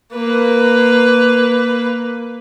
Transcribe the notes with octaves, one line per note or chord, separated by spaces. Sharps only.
A#3 B4